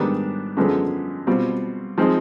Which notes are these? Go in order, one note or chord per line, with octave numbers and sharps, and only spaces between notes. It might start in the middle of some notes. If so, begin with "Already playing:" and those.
Already playing: G#2 D#3 G3 B3 D4
F#2 D3 F3 G#3 B3
B2 G3 C4 F4
F3 G#3 C4 D#4